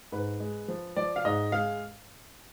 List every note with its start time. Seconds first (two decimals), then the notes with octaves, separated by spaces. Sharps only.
0.12 G#2 B4
0.40 G#3
0.68 F3
0.96 F3 D5
1.16 F5
1.25 G#2 D#5
1.52 G#3 F5